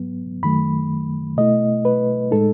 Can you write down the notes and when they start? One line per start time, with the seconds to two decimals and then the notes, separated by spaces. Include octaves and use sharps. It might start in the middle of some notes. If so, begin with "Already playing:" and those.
Already playing: G#2 F#3 B3
0.43 F#2 D#3 F#3 A3 B5
1.37 B2 A3 E4 D#5
1.85 B4
2.31 A2 G#3 D#4 A4